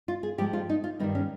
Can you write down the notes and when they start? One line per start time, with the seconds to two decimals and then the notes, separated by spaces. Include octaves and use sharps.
0.08 F4
0.23 G#4
0.38 G#2 F3 G#3 G4
0.53 F4
0.69 D#4
0.84 F4
0.99 G2 D#3 G3 D#4
1.15 C#4